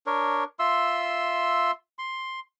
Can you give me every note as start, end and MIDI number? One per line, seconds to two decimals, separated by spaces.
0.06 0.44 62
0.06 0.44 70
0.06 0.44 73
0.59 1.71 65
0.59 1.71 76
0.59 1.71 84
0.59 1.71 88
1.99 2.40 84